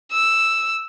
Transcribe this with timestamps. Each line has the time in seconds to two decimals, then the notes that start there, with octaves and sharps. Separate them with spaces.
0.12 E6